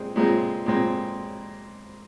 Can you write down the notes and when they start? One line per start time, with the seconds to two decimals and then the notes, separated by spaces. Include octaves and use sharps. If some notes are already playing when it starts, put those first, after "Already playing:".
Already playing: A#2 G#3 C4
0.16 A#2 G#3 C4
0.66 A#2 G#3 C4